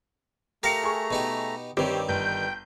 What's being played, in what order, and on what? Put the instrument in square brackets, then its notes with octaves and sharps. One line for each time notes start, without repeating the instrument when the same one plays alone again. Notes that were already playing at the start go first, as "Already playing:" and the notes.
[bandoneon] A3 A#5 [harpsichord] G4 A#4 F5 [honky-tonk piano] A#6 C#7
[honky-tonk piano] G#4 C#6
[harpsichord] B2 D#4 G4
[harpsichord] G2 D#3 [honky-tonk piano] C4 C#5 [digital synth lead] G4
[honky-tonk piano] G1 [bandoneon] G5 [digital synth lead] G6